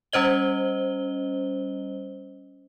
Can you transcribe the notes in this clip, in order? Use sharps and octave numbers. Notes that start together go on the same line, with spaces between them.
G3 C#4 C5 D#5 G7